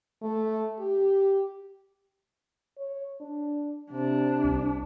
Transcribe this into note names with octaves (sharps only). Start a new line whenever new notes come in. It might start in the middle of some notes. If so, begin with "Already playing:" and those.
A3
G4
C#5
D4
C3 D4
C2